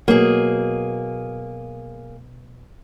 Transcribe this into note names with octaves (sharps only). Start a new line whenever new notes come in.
B2 F#3 A#3 G#4